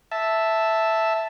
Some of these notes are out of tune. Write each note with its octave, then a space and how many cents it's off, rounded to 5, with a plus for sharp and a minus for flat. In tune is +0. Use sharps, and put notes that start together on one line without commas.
E5 +0 A5 +0